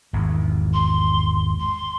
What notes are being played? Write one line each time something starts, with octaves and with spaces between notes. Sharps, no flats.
G#1 E2
C6
C6